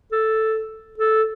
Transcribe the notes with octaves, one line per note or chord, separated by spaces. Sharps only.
A4
A4